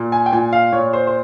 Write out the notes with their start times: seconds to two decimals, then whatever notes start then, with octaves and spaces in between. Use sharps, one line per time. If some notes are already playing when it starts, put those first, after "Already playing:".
Already playing: A#2
0.12 G#5
0.26 G5
0.32 A#2 G#5
0.53 F5
0.72 A#2 C#5
0.93 C5
1.07 C5